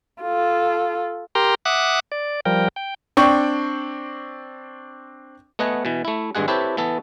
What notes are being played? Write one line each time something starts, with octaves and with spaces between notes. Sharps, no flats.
F4 A4
G4 A#4 G5 A#5 C6
E5 F#5 D6 D#6 F#6
D5
F3 G3 A#4 G5
G5
C4 D4 G5 C#6
A3 B3 D#5 F#5 G#5
B2 E3
A3 E4
G#1 G2 G#3 G#4 F#5
C4 E4 G4 A4 B4 C#5
E3 B3 A4